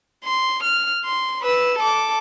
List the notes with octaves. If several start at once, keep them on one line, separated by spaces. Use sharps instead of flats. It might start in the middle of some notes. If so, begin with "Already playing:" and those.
C6
F6
C6
B4 E6
A4 D6